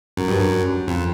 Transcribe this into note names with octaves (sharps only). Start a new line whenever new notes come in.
F#2
G2
F#2
F2